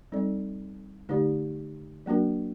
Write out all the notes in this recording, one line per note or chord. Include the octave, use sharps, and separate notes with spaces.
G3 C4 D#4 A4 D5
D3 A3 D#4 G4 D5
F#3 A#3 D4 F#4 A#4